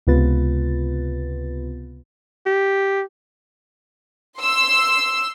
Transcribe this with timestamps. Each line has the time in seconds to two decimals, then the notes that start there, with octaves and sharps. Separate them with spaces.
0.07 C#2 C3 B3 F4 B4 A6
2.46 G4
4.39 C6 E6